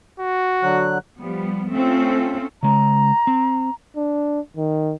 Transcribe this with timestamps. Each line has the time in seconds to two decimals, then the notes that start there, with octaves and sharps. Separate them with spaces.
0.20 F#4
0.63 D3 F#3 F#6
1.18 F3 G3 B3
1.71 A3 C4 C#4 F4 A4
2.63 C#3 G#3 A#5
3.27 C4
3.96 D4
4.57 D#3